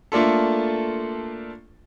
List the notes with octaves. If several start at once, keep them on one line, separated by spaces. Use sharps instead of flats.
A3 A#3 D4 F4 A4